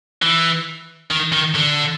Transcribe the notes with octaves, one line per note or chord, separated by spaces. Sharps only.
E3
D#3
D#3
D3